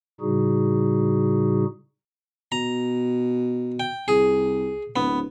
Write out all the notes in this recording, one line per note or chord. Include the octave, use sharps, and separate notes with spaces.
A2 C#3 G3 D#4 F#4 G#4
B2 A#5
G5
C2 G#4
D1 B3